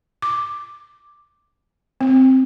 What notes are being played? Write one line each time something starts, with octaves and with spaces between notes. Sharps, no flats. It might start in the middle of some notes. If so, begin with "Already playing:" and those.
D6
C4